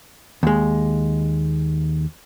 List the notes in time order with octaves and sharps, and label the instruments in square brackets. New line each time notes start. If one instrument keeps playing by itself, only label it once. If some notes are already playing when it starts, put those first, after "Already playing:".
[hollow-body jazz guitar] D#2 G#3